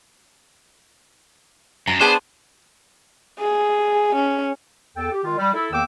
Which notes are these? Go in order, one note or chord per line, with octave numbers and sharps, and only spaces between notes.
F#2 A#5
B3 D4 G#4 B4 C5 D5 A5
G#4
C#4
E2 A4 G5
G4
D#3 G#3 F4
G3
E4 A4
E2 D#3 A#3 G5 D6 E6